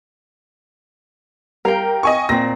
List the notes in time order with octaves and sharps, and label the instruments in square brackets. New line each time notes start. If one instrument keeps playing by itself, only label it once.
[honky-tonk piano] G3 A#4 [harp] F5 G5
[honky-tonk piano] D#5 G#5 C#6
[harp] A#2 C4 [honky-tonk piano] A#6